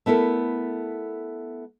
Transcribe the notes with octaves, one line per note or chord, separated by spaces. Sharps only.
A3 B3 E4 A4 A#4